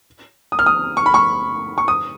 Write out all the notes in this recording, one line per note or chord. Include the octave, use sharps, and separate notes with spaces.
D#6
F6
D#6
C#6
B5
C#6
C#6
D#6